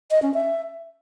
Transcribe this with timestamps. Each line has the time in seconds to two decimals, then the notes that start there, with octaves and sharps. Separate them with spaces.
0.11 D#5
0.22 C#4
0.34 E5